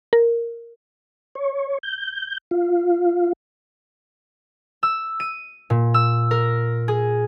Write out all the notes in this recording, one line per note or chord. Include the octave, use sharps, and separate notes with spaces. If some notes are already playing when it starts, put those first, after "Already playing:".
A#4
C#5
G6
F4
E6
D#7
A#2
E6
A#4
G#4